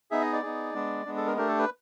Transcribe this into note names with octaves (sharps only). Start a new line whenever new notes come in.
B3 D#4 G#4 E5
D#5
D5
B3 D#4 G#4
G#3 B3 D4
G#3 B3 D4
A4
A#4
A3 D4 G4 A#4
A4
B4